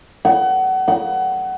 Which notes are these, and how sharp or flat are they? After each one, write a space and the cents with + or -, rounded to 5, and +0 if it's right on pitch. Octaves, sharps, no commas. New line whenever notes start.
F#5 +30
F#5 +25